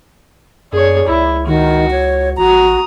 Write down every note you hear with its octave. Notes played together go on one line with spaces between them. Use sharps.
F#2 G#4 C#5 D5
C#2 E4
D#3 F#4
C#5
A1 F#4 A#5 D#6